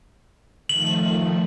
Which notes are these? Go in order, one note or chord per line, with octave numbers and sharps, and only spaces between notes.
D#3 F3 A3 F#7